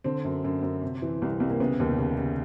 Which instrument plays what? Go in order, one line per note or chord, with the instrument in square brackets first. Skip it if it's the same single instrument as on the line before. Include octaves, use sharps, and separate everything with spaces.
[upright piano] D3 C4
F#2
F#2
F#2
C3
E3
C2
C2
A#3
C#3 B3
D#2
C#3
C#3